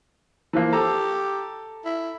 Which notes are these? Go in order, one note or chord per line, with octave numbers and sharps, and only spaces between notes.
E3 F3 A#3
G4 A4 A#5
E4